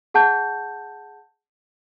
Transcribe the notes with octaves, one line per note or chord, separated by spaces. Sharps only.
G#4 F#5 A5 G6